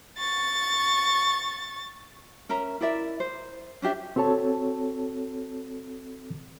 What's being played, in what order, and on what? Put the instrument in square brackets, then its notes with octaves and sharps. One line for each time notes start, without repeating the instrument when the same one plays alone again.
[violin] C#6 A6
[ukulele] C#4 A#4 E5 A#5
E4 A#4 D5 E5
C5
C#4 D4 G4 E5
[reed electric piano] C4 F#4 A4 C#5 A5